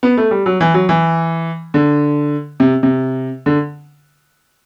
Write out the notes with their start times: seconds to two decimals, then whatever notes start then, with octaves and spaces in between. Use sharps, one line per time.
0.03 B3
0.17 A3
0.31 G3
0.46 F#3
0.60 E3
0.74 F#3
0.89 E3
1.74 D3
2.60 C3
2.83 C3
3.46 D3